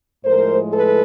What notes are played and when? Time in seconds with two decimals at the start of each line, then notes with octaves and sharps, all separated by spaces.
0.25 A2 F3 G#3 A#4 C5
0.72 A4 B4